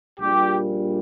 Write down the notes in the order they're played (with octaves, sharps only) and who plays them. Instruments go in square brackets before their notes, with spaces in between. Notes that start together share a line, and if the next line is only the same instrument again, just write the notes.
[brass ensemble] A#1 A#2 G3 G4